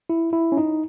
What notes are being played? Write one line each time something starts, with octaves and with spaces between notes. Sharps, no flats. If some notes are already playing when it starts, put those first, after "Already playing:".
E4
E4
C#4
D#4